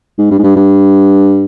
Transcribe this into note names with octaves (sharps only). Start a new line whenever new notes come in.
G#2
G2
G#2
G2
G2